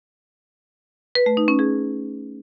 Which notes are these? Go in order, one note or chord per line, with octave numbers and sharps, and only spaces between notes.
B4
A3
D#4
C#4
G#4